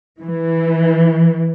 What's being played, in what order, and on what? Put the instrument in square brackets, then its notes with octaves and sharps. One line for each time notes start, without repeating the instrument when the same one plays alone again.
[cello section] E3